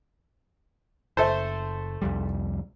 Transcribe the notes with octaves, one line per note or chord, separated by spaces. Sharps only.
F#1 A3 A4 C5
C2 F2 G3